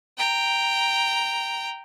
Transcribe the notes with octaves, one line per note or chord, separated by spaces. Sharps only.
G5 A#5